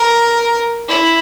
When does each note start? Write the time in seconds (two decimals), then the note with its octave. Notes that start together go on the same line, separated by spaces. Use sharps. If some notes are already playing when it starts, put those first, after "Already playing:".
Already playing: A#4
0.88 E4